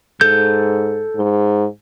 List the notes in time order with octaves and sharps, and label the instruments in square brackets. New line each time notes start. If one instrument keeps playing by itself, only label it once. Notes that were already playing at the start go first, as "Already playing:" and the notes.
[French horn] G#2 [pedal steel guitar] A4 G6
[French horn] G#2